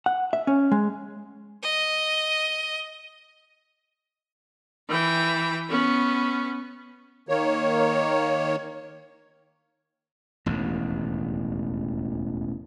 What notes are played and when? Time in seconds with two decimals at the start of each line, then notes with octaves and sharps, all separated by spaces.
0.06 F#5
0.33 E5
0.47 C#4
0.72 G#3
1.63 D#5
4.89 E3 G5
5.70 B3 C#4
7.29 D#3 A#3 C#5
10.46 E1 A1 D#2